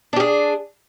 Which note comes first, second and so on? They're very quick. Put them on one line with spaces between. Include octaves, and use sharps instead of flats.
D4 G4 G#4